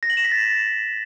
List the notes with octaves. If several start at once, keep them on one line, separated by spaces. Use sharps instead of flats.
A#6
F#7
E7
B6
A6